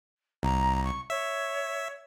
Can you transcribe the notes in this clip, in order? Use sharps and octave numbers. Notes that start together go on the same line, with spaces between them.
C2 A#5
C#6
C#5 E5